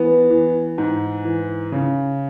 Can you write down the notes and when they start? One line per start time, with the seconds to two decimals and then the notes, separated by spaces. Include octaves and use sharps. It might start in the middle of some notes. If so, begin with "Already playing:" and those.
Already playing: E3 B3
0.30 E3
0.78 G#2
1.25 E3
1.72 C#3